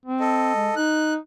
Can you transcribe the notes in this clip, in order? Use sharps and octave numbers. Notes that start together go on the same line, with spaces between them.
C4
A4 D#5
G#3
D#4 F#6